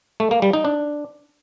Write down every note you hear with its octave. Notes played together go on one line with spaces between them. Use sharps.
A3
A#3
G3
D#4
D4